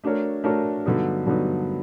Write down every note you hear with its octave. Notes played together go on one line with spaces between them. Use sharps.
A3 D4 F#4 A#4 C#5
A3 D4 F#4 A#4 C#5
G2 D3 F#3 B3 D#4
G2 D3 F#3 B3 D#4